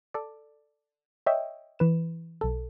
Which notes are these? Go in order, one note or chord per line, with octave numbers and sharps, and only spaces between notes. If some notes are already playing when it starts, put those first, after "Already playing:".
A4 D5
C#5 D#5 E5 G5
E3 B4 E7
B1 A4